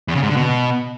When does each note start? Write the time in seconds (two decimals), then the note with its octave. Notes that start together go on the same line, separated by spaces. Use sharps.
0.08 E2
0.15 C#3
0.22 G#2
0.29 D3
0.37 B2